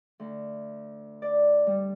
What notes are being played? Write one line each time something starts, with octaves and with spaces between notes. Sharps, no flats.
D2
D5
G3